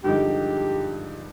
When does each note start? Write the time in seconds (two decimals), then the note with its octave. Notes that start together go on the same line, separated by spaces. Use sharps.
0.04 G2 D3 F3 G#3 D#4 G4